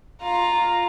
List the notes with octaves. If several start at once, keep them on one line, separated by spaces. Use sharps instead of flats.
F4 F5 A#5